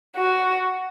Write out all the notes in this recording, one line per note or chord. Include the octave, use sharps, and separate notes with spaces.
F#4